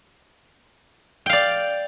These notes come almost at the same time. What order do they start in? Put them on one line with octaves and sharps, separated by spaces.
G5 F5 D5